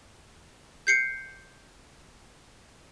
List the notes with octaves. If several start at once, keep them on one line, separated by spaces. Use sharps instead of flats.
G6 C7 C#7